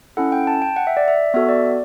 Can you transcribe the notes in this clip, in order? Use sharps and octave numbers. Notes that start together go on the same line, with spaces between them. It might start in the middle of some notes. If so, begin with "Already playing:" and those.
C#4 E4 A4 F#5
G5
A5
G5
F#5
E5
D5
E5
B3 F#4 A4 E5
D5